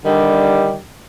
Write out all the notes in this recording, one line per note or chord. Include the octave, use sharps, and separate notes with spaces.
D3 D#3 G3